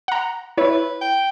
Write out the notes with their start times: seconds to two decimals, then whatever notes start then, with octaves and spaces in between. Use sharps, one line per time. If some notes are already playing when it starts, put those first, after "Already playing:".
0.08 F#5 A#5
0.58 E4 B4 C#5
1.01 G5